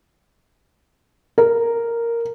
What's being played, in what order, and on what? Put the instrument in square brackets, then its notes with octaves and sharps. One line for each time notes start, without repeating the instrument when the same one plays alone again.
[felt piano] A#4